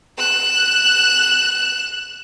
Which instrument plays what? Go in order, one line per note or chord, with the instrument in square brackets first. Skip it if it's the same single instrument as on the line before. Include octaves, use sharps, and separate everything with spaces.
[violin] F#6 E7